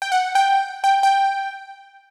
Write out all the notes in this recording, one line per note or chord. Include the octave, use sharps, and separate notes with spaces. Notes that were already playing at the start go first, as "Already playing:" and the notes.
G5
F#5
G5
G5
G5